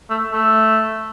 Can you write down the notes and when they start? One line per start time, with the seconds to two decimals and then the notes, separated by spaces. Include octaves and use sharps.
0.10 A3
0.33 A3